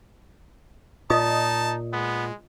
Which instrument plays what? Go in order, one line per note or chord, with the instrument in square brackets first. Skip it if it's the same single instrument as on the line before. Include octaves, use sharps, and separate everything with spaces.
[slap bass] A#2 [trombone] D#4 [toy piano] F4 D#5 D#6 [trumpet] A5
[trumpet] G#3 [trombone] B3